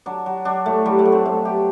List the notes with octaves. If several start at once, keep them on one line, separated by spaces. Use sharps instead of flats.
F#3 D4
F#3
F#3 D4
A2 A3
F#3 G3
A3
F#3
C4
B2 A3
F#3 G4